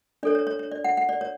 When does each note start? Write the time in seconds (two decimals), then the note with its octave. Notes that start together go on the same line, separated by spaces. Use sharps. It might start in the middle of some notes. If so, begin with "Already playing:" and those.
0.23 D4 A4 C#5 D5
0.35 C#5
0.47 C#5
0.59 C#5
0.71 D5
0.84 F#5
0.97 F#5
1.09 D5
1.21 C#5